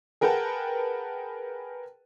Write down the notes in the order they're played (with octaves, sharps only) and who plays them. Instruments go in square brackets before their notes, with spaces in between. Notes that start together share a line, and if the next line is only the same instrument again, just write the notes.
[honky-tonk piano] G#4 A#4 B4 F#5 G5 A5